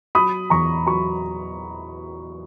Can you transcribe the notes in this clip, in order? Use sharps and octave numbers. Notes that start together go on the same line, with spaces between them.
F#3 B5 D#6
E2 A#5 C#6
F#3 A#5 C#6